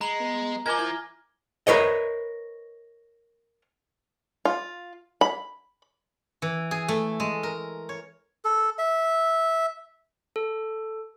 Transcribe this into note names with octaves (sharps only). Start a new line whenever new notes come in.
G#3 A#5 B5 F#7
B3
F3 A#4 D#5 G#5 D6 G#6 G7
E4 G#6
A#4 B4 C#5 D#5
F4
B5
E3
G#4
A3
G#3
A#4
C#5
A4
E5
A4